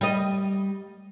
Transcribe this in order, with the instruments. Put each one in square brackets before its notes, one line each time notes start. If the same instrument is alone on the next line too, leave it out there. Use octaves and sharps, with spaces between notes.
[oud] G3 D#5